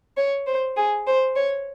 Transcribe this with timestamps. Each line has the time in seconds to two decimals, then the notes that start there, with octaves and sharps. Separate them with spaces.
0.17 C#5
0.47 C5
0.77 G#4
1.07 C5
1.36 C#5